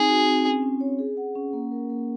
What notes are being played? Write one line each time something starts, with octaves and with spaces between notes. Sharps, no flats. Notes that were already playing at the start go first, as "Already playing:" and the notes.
Already playing: C4 D#4 G#4
F#4
C4
C#4
C#4
C#5
G#4
F#5
C#4
A#3
A#4
A#3